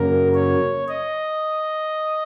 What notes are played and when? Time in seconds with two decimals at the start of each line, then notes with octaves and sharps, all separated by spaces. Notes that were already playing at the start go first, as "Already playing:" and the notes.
Already playing: F#2 C#3 F#3 A#3 A#4
0.34 C#5
0.89 D#5